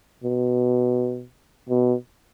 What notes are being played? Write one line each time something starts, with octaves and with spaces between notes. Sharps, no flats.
B2
B2